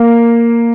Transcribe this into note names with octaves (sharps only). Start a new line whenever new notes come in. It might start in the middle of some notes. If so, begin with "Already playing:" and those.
Already playing: A#3